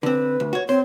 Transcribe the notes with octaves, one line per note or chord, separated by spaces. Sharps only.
D3 C4 B4
D2
F#4 C#5
C4 C5 C#5